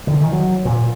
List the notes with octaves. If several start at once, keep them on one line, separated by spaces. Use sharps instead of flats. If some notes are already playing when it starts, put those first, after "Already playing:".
D3 D#3
D#3 E3
F#3
A#2